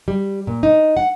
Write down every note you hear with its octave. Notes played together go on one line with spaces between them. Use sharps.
G3
A#2
D#4
F#5